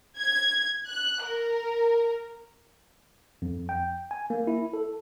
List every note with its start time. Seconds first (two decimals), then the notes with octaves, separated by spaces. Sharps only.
0.17 G#6
0.86 F#6
1.24 A#4
3.42 F2
3.69 G5
4.11 G#5
4.30 A#3
4.47 E4
4.74 A4